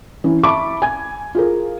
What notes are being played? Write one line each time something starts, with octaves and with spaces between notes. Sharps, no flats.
E3 C#4
E5 A5 B5 C#6 D6
G#5 G#6
F4 G#4 A#4